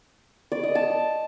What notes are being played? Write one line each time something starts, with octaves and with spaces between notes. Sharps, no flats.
D5
D#5
A5